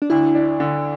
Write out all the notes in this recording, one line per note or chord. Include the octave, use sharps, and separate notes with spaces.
D4
D2 E4
D4
D3